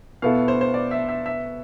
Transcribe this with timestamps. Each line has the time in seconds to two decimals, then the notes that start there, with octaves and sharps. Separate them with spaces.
0.22 B2 B3 E4 A4 F5
0.48 C5
0.61 C5
0.74 D5
0.91 E5
1.09 E5
1.26 E5